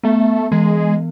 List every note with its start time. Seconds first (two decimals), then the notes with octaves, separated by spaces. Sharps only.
0.04 A3 B3
0.52 E3 G#3